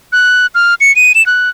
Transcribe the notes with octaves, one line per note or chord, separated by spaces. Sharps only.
F#6
F6
C#7
D#7
E7
F#6